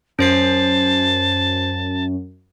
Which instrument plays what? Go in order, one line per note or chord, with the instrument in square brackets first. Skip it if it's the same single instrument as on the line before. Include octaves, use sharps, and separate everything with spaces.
[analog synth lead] F#2 [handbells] C#4 C5 C7 [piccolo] A5